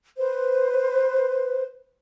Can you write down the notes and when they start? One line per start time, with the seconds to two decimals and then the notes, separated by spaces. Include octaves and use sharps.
0.17 B4 C5